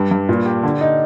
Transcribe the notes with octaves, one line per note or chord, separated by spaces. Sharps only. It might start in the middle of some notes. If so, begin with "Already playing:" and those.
Already playing: G2 G4
G2
A#2
G4
D3
D#4